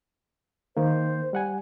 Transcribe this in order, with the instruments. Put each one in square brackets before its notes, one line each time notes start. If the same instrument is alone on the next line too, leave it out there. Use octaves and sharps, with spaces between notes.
[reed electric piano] D#3 A#3 [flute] C5
[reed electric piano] G3 F#5 G#5